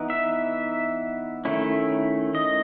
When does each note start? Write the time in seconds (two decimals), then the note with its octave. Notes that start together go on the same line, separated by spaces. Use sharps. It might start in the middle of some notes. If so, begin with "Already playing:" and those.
Already playing: E3 B3 D#4
0.10 E5
1.45 D#3 A3 C#4 E4
2.35 D#5